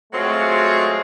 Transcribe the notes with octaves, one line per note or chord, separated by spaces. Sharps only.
F#3 G#3 A3 C4 F4 F#4